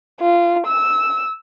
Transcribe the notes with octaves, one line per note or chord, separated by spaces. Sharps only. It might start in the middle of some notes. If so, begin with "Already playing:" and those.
F4
E6